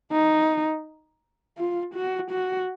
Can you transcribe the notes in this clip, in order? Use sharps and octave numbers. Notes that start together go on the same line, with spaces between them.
D#4
F4
F#4
F#4